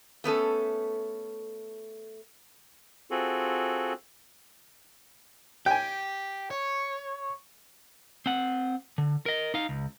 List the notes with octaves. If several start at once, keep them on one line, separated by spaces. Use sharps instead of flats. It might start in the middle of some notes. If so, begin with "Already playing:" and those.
A3 B3 C#4 A4
C4 F4 F#4 G#4 A4
G4 G5 G#5
C#5
C4 F#5
D3
A#4 D#5
D#4 F5
C#2